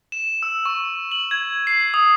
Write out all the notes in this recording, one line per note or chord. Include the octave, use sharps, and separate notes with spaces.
E7
E6
C#6
F#7
G#6
C7
D#6